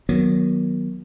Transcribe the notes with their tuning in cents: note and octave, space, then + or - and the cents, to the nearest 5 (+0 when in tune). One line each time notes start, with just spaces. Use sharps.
D#3 +0 F#3 +0 B3 -25